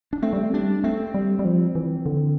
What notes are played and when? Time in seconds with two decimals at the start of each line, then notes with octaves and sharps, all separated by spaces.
0.13 D4
0.22 A3 C4
0.33 G3
0.43 A3
0.53 G3 D4
0.84 A3 C4
1.14 G3
1.39 G3
1.45 F3
1.75 E3
2.06 D3